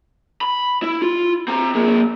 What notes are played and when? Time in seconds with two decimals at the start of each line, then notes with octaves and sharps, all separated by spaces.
0.41 B5
0.82 E4
1.02 F4
1.48 C4 A#5
1.74 A#3 G#4